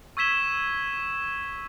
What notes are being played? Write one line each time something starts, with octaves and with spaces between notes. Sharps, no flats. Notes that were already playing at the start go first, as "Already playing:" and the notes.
C#6 E6 G#6 B6 E7 G7